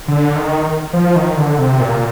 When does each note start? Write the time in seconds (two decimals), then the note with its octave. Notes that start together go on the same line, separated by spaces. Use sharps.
0.08 D3
0.36 D#3
0.93 F3
1.16 D#3
1.37 D3
1.59 C3
1.80 A#2